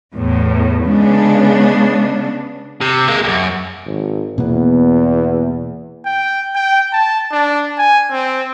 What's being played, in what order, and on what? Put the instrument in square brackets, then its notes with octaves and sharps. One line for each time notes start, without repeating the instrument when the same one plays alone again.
[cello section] E2 A2
[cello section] C#3 B3 D4 [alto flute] G#3
[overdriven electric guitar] C3
G#3 A#3
C#2 F#2
[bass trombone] G#1
[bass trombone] E2 [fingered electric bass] B2 A#3 B3
[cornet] G5
G5
A5
D4
G#5
C4